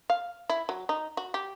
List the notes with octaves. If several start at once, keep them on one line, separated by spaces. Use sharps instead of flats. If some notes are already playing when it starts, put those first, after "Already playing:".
F5
E4
F#3
D#4
F#4
G4